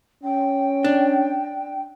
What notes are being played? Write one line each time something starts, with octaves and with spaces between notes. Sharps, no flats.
C#4 G5
D4